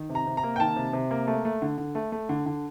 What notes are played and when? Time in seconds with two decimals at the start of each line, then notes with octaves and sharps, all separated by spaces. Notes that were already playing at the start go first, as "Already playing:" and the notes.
Already playing: D#3
0.09 C3
0.15 A#5
0.27 C3
0.37 A#5
0.43 A#3
0.56 G5
0.60 D#3 A5
0.76 C3
0.93 C3
1.11 A#3
1.27 A3
1.45 A3
1.62 D3
1.78 D3
1.95 A3
2.12 A3
2.29 D3
2.46 D3